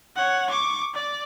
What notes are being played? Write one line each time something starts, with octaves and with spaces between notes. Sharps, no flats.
C#5 F#5
C#6 D6
D5